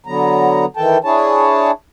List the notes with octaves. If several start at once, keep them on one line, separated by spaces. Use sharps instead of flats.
D3 F#3 B3 A#5
D#3 E3 A4 G5 A5
D4 E4 G#4 C#5 A5